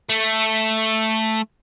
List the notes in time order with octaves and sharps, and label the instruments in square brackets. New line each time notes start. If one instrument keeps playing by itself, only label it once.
[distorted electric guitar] A3